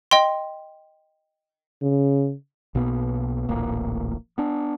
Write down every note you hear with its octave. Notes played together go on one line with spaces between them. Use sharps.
D#5 G5 C6
C#3
B1 B2 A#3 B3
D1 A1 A#2 A#3
B3 D4